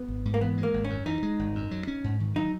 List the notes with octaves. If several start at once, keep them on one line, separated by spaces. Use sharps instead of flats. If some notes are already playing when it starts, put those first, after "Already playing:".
Already playing: B3
G#1
G#2
A#3
E3 B3
G#3
A#3
G#1
C#4
F#2
E3 D#4
G#3
G#1
F#2
F#3
C#4
G#2
D#3
F#3 D#4